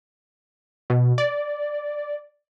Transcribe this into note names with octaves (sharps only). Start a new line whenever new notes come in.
B2
D5